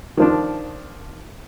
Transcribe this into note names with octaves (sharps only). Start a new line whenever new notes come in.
D#3 F3 D4